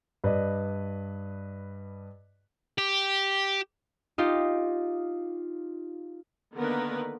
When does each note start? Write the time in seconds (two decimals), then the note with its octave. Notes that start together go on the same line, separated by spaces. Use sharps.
0.24 G2 B4 D5 D#5
2.78 G4
4.18 D#4 F4 G4
6.54 D3 D#3 A#3 B3 A#4 B4